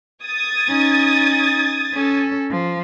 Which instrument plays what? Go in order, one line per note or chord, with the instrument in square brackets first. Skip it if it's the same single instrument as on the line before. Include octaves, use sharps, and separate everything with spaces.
[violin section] D#6 G#6 A6
[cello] C#4 D#4
C#4 A4
F3